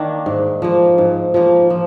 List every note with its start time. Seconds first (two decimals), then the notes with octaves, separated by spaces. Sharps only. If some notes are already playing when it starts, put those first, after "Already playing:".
Already playing: D#3 A#3 D4
0.26 G#2
0.62 F3 A#3
0.98 G#2
1.34 F3 A#3
1.70 F3